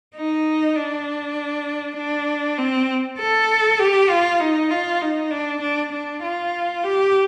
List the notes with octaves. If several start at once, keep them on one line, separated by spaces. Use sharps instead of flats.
D#4
D4
D4
C4
A4
G4
F4
D#4
F4
D#4
D4
D4
D4
F4
G4